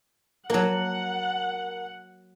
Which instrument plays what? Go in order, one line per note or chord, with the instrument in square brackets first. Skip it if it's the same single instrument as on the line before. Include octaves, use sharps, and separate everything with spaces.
[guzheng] F#3 A#3 [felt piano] A#4 A5 [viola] F#5